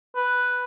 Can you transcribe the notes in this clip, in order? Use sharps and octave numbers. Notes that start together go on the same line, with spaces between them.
B4